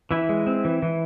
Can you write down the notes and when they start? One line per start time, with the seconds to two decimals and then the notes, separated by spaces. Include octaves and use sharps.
0.11 E3 E4
0.29 G#3
0.47 C4
0.65 E3
0.82 E3